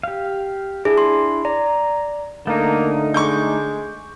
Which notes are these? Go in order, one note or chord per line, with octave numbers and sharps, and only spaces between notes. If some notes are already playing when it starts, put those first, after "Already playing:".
G4 F5
D4 E4 G#4
C6
D5 A#5
D3 A3 A#3 D#4
G#3 C#6 D6 G6